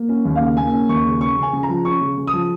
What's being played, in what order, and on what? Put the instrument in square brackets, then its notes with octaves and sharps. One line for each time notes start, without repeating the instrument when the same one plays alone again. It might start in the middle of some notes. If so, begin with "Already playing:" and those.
Already playing: [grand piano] A#3
C#4
D#2
F5
C#3
A#3 G#5
C#4
D#2 C#6
C#3
C#4 C#6
C#3
G#5
C#3
A#5
F3
C#4 C#6
C#3
C#3
D#6
F3